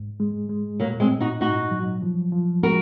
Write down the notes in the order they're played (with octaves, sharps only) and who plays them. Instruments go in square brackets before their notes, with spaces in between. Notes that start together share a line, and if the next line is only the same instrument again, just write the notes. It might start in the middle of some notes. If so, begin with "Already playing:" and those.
Already playing: [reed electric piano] G#2
G#3
G#3
[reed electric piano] A#2 [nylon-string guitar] F#3 A#3
[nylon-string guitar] G#3 C4
[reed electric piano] A#2
[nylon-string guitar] D#4 F#4
[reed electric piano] G#2 [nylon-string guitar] D#4 F#4
[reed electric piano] F#3
F3
F3
[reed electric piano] G#3 [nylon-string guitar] F#4 A#4